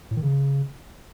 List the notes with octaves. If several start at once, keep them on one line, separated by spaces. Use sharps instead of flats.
A2
D#3
C#3